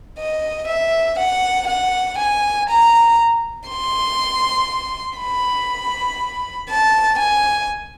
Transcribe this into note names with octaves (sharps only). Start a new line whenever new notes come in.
D#5
E5
F#5
F#5
G#5
A#5
C6
B5
A5
G#5